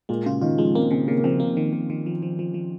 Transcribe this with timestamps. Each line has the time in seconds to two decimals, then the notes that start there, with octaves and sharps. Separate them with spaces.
0.09 A#2 G#3
0.26 C#3 F4
0.42 D#3 F4
0.58 F3 G#3
0.75 A#3 C4
0.91 C#3 C4
1.07 C#3 A#3
1.18 A#3
1.24 F3 C4
1.40 A#3
1.57 D#3
1.73 D#3
1.90 D#3
2.06 F3
2.22 F3
2.39 F3
2.54 F3